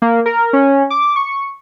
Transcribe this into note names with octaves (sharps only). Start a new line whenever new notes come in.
A#3
A#4
C#4
D6
C#6